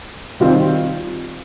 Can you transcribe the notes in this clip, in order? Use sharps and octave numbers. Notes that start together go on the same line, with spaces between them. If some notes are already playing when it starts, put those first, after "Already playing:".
D#3 G3 C4 F4